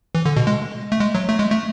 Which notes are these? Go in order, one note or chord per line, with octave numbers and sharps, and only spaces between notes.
E3
D3
B2
G#3
A3
G#3
F#3
A3
G#3
A3